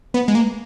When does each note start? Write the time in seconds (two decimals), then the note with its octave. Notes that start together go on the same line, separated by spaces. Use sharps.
0.14 B3
0.28 G#3
0.35 A#3